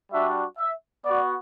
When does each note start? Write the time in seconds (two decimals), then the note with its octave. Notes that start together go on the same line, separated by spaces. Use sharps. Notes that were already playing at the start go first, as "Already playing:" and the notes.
0.12 G3 D4 F#4 E5
0.58 E5
1.04 B3 F#4 D5